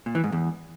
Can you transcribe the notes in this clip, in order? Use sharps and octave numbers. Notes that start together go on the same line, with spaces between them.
A#2
E3
G#2
E2